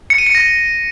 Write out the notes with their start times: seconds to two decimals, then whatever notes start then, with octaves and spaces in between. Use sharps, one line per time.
0.10 C#7
0.18 D#7
0.27 C#7
0.35 A#6